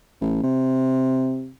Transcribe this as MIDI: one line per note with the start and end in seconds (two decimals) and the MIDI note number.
0.21 0.42 33
0.43 1.51 48